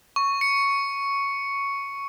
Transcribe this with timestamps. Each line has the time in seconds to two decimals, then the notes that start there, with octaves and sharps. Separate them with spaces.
0.16 C#6
0.41 C#7